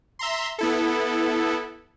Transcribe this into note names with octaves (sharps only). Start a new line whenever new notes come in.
E5 A#5 C6
B3 E4 A4